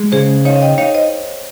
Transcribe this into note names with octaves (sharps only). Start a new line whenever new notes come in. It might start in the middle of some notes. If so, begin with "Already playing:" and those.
Already playing: G#3
C#3 G#4 C5
D#4 C#5 F5
F5
D#5 G5
D#4 C#5 F5
C5 D#5